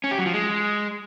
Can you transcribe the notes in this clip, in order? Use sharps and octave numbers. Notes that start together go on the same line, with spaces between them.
C#4
G4
F#3
F3
G#3